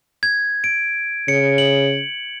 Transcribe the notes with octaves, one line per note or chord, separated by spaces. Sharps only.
G#6
D7
C#3 C#7
F#7